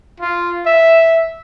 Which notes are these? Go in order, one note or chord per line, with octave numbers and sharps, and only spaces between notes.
F4
E5